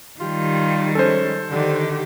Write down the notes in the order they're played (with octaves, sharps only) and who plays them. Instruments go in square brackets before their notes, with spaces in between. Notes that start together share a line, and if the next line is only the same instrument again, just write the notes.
[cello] D#3 G3 [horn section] F4 G4
[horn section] F3 G#3 C#4 [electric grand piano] A4 C5
[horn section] D3 [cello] D#3 G4